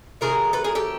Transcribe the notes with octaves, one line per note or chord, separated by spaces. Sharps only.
C3 D#3 F#3 A3 G#4 A#4
A4 B4
G#4 A#4
G4 A4